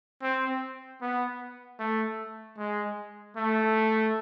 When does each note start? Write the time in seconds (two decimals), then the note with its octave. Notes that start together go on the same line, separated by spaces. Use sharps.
0.23 C4
1.02 B3
1.79 A3
2.58 G#3
3.36 A3